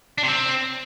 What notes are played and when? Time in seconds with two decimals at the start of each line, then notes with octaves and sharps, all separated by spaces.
0.18 D4
0.23 C3
0.28 C4